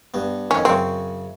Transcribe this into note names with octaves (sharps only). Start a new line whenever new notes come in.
G2 B3
F2 D#3 C#4
F#2 C#3 C4 C#6